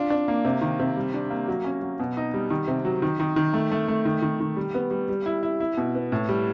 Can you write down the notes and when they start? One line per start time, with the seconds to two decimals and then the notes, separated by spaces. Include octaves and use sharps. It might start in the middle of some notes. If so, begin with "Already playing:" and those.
Already playing: D4 F4
0.10 D4
0.28 A#3
0.45 C3
0.61 D#3
0.80 C3
0.97 G3
1.14 D4
1.30 A#3
1.48 F#3
1.64 C#4
1.82 F#3
1.99 B2
2.17 D#4
2.34 G3
2.50 D#3
2.67 C3
2.85 F#3
3.02 D#3
3.20 D#3
3.36 D#3
3.54 A3
3.72 A3
3.88 A3
4.05 D#3
4.22 D#3
4.40 D#3
4.56 G3
4.74 B3
4.91 G3
5.09 G3
5.26 E4
5.43 E4
5.60 E4
5.77 B2
5.95 B3
6.12 A2
6.29 G3